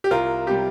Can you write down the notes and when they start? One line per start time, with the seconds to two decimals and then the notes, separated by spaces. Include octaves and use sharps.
0.04 G4
0.11 C2 F4 A#4
0.47 C3 G3 G4